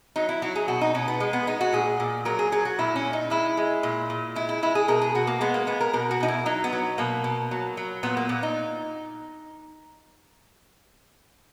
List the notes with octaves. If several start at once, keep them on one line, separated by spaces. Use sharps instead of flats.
F#3 D#4
E4
F#3 F#4
G#4
B2 F#4
D#4
B2 C#4
B3
G#3
B3
G#3 D#4
F#4
A#2 G#4
A#2
F#3 A#4
G#4
F#3 G#4
F#4
A#2 E4
C#4
A#2
D#4
G#3 E4
G#3
A#2
A#2
G#3 E4
E4
G#3 E4
G#4
B2 A#4
G#4
B2 F#4
A#3
G#3 B3
A#3
G#3 B3
A#4
B2 A#4
F#4
B2 D#4
E4
F#3 D#4
B3
F#3
B2 A#3
B2
F#3
F#3
A#2 B3
A#3
A#2 B3
D#4